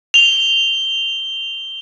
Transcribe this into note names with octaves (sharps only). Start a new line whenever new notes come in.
F7 G7